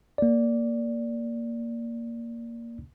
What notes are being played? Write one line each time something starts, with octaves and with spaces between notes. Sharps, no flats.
A#3 D5